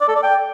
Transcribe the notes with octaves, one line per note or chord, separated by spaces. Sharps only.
D5
A4
D5
G5